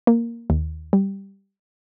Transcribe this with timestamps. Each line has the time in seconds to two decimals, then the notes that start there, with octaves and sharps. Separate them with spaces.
0.07 A#3
0.50 D#2
0.93 G3